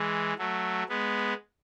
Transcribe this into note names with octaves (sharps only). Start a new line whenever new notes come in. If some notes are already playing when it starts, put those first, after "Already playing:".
Already playing: E3 G#3
F#3 A3
G#3 B3